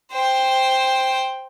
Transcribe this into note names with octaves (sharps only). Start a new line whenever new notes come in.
C5 G5